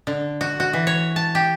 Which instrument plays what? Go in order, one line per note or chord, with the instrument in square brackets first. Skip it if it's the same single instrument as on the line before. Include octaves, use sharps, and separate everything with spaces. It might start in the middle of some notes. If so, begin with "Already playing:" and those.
[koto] D3
F#4
F#4
E3
C#5
A5
G4